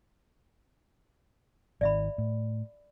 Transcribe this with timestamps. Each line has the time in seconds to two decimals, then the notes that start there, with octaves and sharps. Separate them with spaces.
1.81 G#1 D#3 D5 E5 B5
2.18 A2